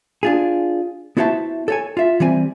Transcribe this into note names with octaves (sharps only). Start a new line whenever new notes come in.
D4 F4 G#4
B3 E4 F#4 C5 E5 A5
A4 C#5 G#5
F4 E5
E3 G3 C4 G#5